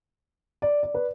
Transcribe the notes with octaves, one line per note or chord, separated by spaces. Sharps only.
D5
D5
B4